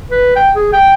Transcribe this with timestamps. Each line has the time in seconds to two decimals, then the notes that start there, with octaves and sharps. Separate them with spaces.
0.11 B4
0.36 G5
0.55 G#4
0.73 G5